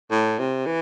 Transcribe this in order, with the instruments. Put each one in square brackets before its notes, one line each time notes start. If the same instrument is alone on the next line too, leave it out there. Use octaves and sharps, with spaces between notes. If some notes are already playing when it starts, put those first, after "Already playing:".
[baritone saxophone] A2
C3
E3